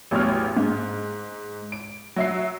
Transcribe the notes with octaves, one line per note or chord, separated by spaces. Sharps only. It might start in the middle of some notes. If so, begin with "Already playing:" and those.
A1 E2 F#3 C#5 F6
G#2
D7
F#3 E5 C7